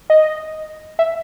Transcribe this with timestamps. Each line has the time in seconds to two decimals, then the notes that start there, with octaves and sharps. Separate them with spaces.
0.10 D#5
0.99 E5